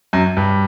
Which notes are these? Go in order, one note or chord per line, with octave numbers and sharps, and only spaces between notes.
F#2
G2